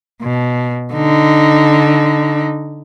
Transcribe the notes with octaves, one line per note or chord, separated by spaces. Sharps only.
B2
D3 D#4